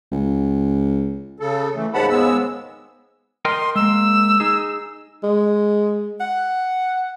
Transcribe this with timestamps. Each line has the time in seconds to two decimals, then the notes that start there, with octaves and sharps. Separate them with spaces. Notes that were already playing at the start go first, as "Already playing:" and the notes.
0.12 C#2
1.40 C#3 A4
1.75 E3 A3
1.94 D#2 G#2 C#3 F#5 A5 B5
2.09 G#3 B3 E6
3.45 A#4 D#5 G5 C6
3.76 G#3 A#3 E6
4.40 D#4 G#4
5.24 G#3
6.20 F#5